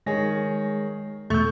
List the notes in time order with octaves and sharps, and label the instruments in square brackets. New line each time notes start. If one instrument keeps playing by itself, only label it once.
[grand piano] D#3 G#4 C#5 [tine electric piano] G#3 A#6
[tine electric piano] E2 B2 [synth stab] A3 [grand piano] C#6 G6